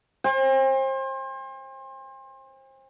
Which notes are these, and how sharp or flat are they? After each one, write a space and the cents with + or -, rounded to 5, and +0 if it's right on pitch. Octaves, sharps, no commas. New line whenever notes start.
C5 +30 G5 +45